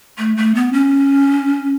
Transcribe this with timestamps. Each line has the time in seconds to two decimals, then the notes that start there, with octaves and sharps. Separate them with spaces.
0.18 A3
0.37 A3
0.55 B3
0.73 C#4